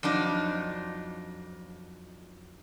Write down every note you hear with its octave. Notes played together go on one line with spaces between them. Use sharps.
F2 F#3 D4 D#4